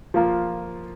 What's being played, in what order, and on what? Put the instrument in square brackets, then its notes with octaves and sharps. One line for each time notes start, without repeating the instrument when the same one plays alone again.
[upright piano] F3 A#3 F4